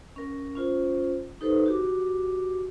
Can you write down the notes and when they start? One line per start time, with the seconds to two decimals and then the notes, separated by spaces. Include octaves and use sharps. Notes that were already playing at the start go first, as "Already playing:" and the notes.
0.16 C#4 A#4
0.55 C#4 F4 C5
1.41 D#4 G4 A4 B4 C5
1.66 F#4 G4 D6